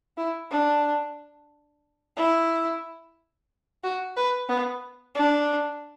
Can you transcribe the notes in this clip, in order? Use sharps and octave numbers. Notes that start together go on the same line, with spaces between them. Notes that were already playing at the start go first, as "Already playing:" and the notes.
E4
D4
E4
F#4
B4
B3
D4